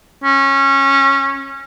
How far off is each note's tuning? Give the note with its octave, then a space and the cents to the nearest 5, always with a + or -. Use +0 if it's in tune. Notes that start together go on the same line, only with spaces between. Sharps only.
C#4 -20